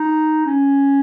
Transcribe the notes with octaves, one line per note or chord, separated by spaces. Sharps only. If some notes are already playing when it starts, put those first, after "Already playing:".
Already playing: D#4
C#4